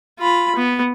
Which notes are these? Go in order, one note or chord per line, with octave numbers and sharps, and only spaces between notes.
F4 B5
B3